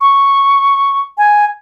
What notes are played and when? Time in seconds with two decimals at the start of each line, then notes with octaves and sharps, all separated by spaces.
0.01 C#6
1.18 G#5